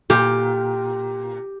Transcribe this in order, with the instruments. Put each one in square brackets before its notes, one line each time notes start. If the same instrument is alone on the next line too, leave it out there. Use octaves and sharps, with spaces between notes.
[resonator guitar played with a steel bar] A#2 [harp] G4